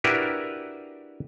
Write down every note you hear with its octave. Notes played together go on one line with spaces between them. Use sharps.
D4 E4 F#4 G4 A#4 B4